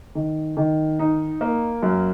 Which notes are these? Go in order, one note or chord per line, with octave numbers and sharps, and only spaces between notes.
D#3
D#3
D#4
A#3
F#2